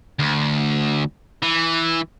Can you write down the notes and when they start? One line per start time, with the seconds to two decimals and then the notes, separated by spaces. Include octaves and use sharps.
0.19 D2
1.42 E3